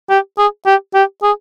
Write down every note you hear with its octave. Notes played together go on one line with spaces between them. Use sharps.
G4
G#4
G4
G4
G#4